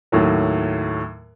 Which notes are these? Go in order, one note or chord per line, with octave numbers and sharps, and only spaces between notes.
D#2 A2 F#3